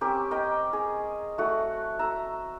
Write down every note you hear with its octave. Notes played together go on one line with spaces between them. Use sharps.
C4 C#4 G4 A#4
A#4 D#5 G5
G#4
A3 F#4
E5 A#5